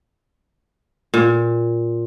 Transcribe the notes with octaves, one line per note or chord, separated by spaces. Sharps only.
A#2